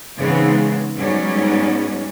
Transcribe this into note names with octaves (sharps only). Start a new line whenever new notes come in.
G#2 C#3 E3 G#3 B3 C4
G#2 F#3 G3 B3 C#4 D#4